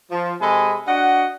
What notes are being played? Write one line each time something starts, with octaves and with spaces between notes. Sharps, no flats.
F3
C3 G#3 A4 D#5 G#5 B5
D4 F#4 D#5 F#5